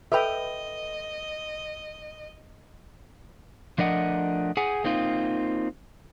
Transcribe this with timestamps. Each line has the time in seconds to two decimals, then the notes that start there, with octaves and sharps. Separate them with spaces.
0.12 A4 B4 D#5 E5 G5 B5
3.78 F3 A3 D4 A#4 D#5 F#5
4.57 G#4 F#5 G#5
4.84 A#3 C4 D#4 F4